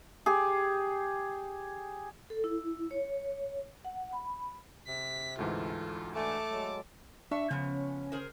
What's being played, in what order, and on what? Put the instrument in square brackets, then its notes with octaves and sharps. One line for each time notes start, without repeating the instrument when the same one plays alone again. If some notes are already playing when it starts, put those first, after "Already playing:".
[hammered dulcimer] G4 G#4
[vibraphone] A4
E4
C#5
F#5
B5
[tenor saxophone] C3 [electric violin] B6
[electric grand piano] D2 G#2 E3 [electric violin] F4 [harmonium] A4
[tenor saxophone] A3 [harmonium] D4 G#5 [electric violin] A5 D6
[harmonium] F#3 G#3 A4
[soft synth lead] D4 [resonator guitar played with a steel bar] E5 [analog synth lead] C#6
[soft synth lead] C#3 [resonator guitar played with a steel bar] F3 B3 [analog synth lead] C#4
[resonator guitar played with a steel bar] G#4 A#4 C5